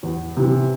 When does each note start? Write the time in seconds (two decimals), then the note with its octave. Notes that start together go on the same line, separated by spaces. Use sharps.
0.03 E2
0.37 C3 E3